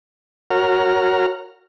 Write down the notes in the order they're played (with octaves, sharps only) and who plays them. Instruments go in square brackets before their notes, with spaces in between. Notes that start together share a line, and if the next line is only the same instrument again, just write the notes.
[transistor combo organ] F#4 A#4 C#5 F#5 A#5 F6